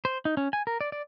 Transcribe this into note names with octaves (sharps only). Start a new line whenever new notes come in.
C5
D#4
C#4
G#5
A#4
D5
D5